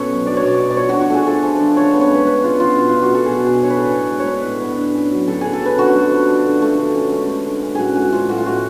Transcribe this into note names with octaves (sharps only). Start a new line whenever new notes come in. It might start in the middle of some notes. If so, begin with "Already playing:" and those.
Already playing: B2 B3 C#4 A4 B4 C#5
F#3
D4 D5
C#5
B2 D5
B3
D5
F3 C#5
D4 F#4
F#4
A3 G#4
F3 A4
F3
D4
C#3 C#5
B3
C#5
G#3 B4
D4 B4
C#3 F4
B3 F4
B2 F#4
F4
D4
F#4
A3 A4
B2 G#4
F#4
B2 G#4
D4 C#5
B4
A2 A4
B3
G#3
C#5
D4 B4
A2
B3
D3
C#4
F#3
D3 A4
D3 G#4
A4
C#4 B4
D3 F#4
A3
F3
D4
D3
A3
D3
C#4
G#3
D3
D3
C#4
A2 F#4 G#4
G#3 F#4
F3 F4
A2 F#4
F4
A2 F#4